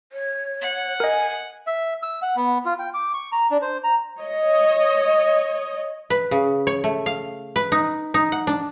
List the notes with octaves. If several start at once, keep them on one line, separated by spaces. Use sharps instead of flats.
C#5
F#5
A#4 D#5 G#5
E5
E6
F#5
B3
F4
G5
D6
C#6
A#5
D4
C5
A#5
C#5 D#5
B4
C#3
C#5
A3
F5
B4
D#4
D#4
F#5
D4